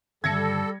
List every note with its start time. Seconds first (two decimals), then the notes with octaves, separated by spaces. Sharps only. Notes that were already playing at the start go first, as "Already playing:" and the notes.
0.24 G2 D3 D#3 G3 A4 G#6 A#6 C#7